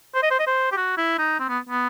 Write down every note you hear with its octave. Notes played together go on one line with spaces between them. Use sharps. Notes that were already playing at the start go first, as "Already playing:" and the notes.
C5
D#5
C5
D#5
C5
G4
F#4
E4
D#4
C4
B3
B3